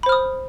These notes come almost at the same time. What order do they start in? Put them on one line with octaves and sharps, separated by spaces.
B5 C5 F6 D#6